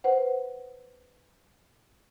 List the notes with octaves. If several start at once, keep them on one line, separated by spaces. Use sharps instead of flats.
B4 C5 F#5